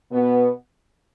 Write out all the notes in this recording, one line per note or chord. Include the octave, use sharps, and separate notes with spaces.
B2 B3